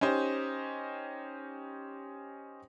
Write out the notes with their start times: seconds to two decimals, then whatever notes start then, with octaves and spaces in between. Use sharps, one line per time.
0.01 C#4 D#4 G4 C5